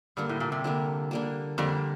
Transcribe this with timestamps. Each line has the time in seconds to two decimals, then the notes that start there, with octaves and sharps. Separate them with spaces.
0.17 G2 D3 G3 A#3
0.29 A2
0.40 A#2
0.52 C3
0.64 D3 G3 A#3
1.11 D3 G3 A#3
1.58 F2 D3 G3 A#3